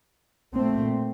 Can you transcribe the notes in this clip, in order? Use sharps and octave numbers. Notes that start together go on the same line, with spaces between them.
A#2 A3 C4